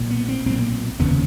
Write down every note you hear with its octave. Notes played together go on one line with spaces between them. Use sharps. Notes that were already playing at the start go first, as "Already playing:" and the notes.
Already playing: B1 A#2
B3
C4
B1 A#2 C4
F1 D#2 C#3 B3